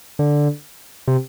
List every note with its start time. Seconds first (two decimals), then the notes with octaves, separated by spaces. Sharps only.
0.19 D3
1.08 C3